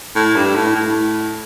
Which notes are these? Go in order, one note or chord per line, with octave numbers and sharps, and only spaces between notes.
A2
G2
A2
A2